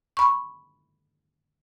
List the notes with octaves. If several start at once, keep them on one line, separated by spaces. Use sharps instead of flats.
B5 C#6